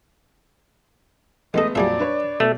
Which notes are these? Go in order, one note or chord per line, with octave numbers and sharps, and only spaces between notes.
A1 G#3 A3 B3 A4 D#5
F2 A#2 F#3 G3 G#4 D5 E5
D4 B4 C#5
B2 A3